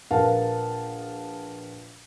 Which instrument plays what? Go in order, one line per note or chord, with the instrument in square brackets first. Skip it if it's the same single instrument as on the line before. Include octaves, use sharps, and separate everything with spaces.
[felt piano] A#1 A#4 B4 F5 F#5 A5